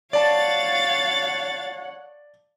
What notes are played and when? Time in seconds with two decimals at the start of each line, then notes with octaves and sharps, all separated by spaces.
0.13 C#5 D5 F5 F#5 A5 A6